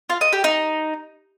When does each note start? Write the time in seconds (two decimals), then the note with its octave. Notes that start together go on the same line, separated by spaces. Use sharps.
0.10 F4
0.21 D#5
0.33 G4
0.44 D#4